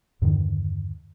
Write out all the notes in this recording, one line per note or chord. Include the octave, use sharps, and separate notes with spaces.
E2 G2 D3 D#3